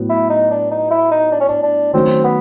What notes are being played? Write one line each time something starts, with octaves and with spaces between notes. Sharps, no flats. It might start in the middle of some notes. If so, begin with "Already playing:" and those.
Already playing: A2 F#3 B3
E4
D#4
D4
D#4
E4
D#4
D4
C#4
D4
D4
D#3 F#3 A3 C4 C#4
B3